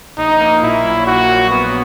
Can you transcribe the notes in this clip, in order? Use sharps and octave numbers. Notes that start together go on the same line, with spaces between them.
A#1 D#4
A#3
A#2 E4
F#3
A#1 F#4
A#3
A#2 B3